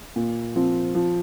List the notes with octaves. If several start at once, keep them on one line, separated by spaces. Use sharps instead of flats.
A#2
F3 C4
F3